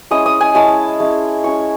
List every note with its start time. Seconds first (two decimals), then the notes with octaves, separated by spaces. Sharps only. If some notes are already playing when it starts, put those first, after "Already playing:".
0.11 G#3 C#4 E4 D#6
0.26 D#6
0.41 G#5
0.55 G#3 C#4 E4 A5
0.99 G#3 C#4 E4
1.44 G#3 C#4 E4 C#6